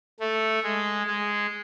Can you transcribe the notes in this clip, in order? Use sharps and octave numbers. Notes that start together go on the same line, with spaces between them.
A3
G#3
G#3